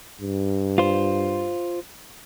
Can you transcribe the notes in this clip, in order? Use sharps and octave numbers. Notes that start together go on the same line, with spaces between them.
G2
F4 C5